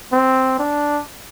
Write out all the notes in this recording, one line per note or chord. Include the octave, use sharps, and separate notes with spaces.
C4
D4